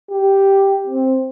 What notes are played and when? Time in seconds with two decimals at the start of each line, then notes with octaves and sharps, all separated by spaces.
0.11 G4
0.87 C4